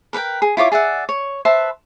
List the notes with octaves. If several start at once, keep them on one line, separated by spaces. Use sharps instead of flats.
A#4 B4 F#5 G5
G#4
E4 F4 C#5 D6
G#4 D5 E5 F#5
C#5
B4 C5 E5 A5